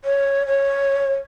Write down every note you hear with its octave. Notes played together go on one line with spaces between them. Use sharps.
C#5
C#5